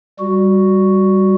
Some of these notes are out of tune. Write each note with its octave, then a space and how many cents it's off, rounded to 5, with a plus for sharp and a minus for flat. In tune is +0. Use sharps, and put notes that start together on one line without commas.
G3 +0 F#4 +0